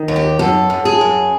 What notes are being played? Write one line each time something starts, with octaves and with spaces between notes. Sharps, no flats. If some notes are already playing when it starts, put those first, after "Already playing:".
Already playing: D#3
D#2
G4
F#2 A4
F#2
G#4
F#2